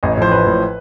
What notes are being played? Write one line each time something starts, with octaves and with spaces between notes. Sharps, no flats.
A1 D#5
C#5
A2 F3 C5
A1 B4
A2 F3